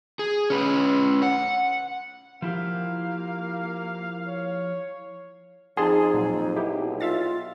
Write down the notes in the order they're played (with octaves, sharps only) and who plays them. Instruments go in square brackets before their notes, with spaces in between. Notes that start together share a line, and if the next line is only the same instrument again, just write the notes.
[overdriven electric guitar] G#4
C#4 B4
F#5
[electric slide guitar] F3 E4 G4 [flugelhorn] A#3 [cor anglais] F5
[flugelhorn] C#5
[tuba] F2 [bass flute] D#4 [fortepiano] G#4 [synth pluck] A5 C6
[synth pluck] A#2 F#3
[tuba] B1 [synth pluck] D#4 E4 G4
[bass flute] F4 [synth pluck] E5 F5 A6